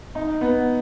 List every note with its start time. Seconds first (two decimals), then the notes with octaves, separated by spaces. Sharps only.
0.15 D#4
0.41 B3